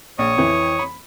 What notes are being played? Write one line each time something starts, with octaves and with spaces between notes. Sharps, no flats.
A#1 C#5 C#6 D#6
F2 E3
B5